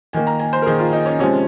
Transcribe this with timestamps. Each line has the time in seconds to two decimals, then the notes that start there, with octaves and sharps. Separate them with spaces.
0.13 D#3 A#3 G#5
0.27 A#5
0.40 G#5
0.53 C5
0.62 A#4
0.66 D#3 A#3 G#4
0.79 F4
0.93 D#4
1.06 C#4
1.19 C3 F3 G#3 C#4